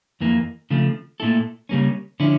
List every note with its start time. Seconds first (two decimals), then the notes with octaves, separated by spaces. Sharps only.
0.20 F2 E3 A#3
0.70 C#3 F3 A3
1.20 A#2 A3 E4 A4
1.69 C#3 G3 A#3 C#4
2.20 D3 F3 C#4 E4